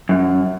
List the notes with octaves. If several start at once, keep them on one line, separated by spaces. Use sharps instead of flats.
F#2